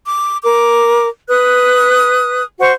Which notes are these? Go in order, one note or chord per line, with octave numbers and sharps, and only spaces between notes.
D6
A#4 D6
B4 D#6 F#6
F#4 C5 C#6